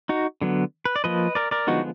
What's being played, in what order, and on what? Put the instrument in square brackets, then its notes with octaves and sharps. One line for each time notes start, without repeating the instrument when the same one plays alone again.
[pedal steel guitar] D#4 F#4
D3 F#3 B3
B4
D5
F3 A#3 B4 D#5
A#4 D5
A#4 D5
D3 F3 G#3 B3 D#4 F#4